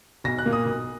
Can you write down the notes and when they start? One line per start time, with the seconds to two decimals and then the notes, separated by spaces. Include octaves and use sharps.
0.24 B1 A#6
0.38 F#6
0.46 A#2 A#3
0.53 D#6
0.66 B1